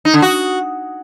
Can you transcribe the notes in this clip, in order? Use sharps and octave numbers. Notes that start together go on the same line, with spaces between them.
D#4
D3
F#4